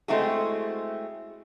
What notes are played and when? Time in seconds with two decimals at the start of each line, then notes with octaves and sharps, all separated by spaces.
0.08 G#3 A3 C4 E4 F#4 G#4